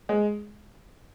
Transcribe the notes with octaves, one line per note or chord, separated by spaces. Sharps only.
G#3